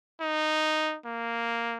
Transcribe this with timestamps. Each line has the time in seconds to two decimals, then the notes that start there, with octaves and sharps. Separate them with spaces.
0.20 D#4
1.06 A#3